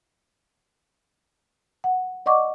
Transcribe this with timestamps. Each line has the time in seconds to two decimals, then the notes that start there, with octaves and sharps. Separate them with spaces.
1.84 F#5
2.26 D5 D#5 F#5 C#6 D6